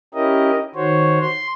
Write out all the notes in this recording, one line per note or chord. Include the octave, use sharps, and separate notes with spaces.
C#4 E4 G4 A#4 D#5
D#3 F#4 C5 C#5
C6